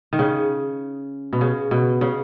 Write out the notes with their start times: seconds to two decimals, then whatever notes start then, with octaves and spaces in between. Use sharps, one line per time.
0.13 D#3
0.19 C#3
1.33 B2
1.41 C#3
1.71 B2
2.01 C#3